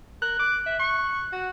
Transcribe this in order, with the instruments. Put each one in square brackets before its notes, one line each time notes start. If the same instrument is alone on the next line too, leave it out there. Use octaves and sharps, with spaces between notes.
[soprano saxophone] A#4 [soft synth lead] F#6
[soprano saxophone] D6
E5
C#6
F#4